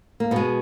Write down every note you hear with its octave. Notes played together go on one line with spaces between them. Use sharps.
A#3
B2 G#3 B3